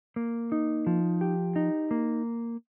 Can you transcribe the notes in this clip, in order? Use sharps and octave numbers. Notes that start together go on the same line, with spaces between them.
A#3
D#4
F3
G4
D#4
A#3